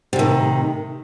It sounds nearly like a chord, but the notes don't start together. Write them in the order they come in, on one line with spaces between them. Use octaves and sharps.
C3 A2 D#3